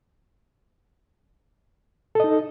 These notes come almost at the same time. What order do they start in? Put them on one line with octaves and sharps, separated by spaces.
A4 D#5 D#4